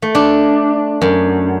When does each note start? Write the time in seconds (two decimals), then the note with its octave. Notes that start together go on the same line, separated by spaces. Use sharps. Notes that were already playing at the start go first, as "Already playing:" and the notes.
0.02 A3
0.15 D4
1.02 F#2